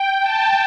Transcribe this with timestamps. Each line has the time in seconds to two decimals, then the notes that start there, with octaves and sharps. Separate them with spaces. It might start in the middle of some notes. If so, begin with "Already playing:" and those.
Already playing: G5
0.21 A5